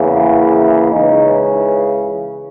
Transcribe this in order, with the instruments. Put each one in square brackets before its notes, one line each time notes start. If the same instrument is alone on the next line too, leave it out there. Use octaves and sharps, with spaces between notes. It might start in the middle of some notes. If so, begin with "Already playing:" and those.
Already playing: [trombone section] E2 C#3 E3 A#3
E4
C#2 C#3 E3 D#4